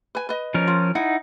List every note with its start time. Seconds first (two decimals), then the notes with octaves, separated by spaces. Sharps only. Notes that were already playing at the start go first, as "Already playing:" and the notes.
0.15 B4 G#5
0.29 B4 D#5
0.54 F3 C#4 A#4
0.68 F4
0.95 D#4 E4 F#5